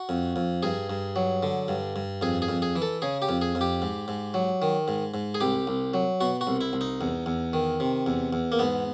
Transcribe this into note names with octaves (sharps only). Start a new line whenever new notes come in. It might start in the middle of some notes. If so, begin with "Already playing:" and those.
Already playing: F#4
F2
F2
G2 G#4
G2
F#3
D3
G2
G2
F2 G#4
G#4
F2
G#4
E3
A4
C#3 G#4
G4
F2
G#4
F2
G4
G#2
G#2
F#3
D#3
G#2
G#2
G#4
C2 G4
C2
F#3
B2 F#4
F#4
C2
E4
C2
D#4
E2
E2
D#3
C3
E2
E2
A#3
G#2 B3